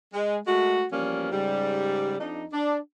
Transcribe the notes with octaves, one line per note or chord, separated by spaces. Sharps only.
G#3
G#3 A3 F#4
E2 F3 G3 A#3 C#4
G#2 C#3 G3
F2 D4 D#4
D4